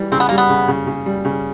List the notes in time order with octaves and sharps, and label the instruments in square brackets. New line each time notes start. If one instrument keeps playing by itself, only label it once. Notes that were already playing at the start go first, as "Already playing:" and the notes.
Already playing: [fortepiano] E3 G3
[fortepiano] C#3 [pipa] C4
[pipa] B3
[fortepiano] G3 [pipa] A#3
[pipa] B3
[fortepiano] C#3
C#3
C#3
G3
C#3